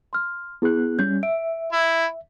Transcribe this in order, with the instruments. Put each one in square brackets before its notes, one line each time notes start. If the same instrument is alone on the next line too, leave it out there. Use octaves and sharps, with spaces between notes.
[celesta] C6 F6
[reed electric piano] B3 F#6 [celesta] E4 G#4
[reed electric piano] G3 C#4 [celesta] G6
[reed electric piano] E5 [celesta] D7
[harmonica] E4